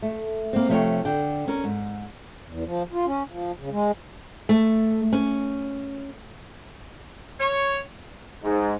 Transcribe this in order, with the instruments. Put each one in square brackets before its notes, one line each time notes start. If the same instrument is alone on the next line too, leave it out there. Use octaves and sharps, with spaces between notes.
[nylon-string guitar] A3
A#3 C4
C3 F3 A3 G#4 C#5 G5
D3 G5
C#4 A#4
G#2
[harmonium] E2
F3
F4
C#4
F3
C#3
G#3
[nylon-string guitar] A3
C#4
[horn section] C#5
[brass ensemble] G#2